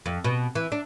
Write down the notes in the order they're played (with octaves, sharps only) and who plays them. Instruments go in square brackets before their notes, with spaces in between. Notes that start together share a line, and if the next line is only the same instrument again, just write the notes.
[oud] F2
B2
E3
D4